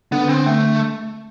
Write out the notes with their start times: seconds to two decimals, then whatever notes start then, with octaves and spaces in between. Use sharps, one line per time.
0.12 D3 B3
0.29 C4
0.46 A3